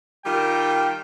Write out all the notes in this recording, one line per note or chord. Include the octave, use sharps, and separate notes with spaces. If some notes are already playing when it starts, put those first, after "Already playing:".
D#3 G3 F4 G5